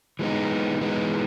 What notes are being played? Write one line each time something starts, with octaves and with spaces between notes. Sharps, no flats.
E3 G#3 B3 D#4
E3 G#3 B3 D#4